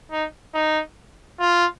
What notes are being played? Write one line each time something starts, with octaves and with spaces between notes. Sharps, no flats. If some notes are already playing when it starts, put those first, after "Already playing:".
D#4
D#4
F4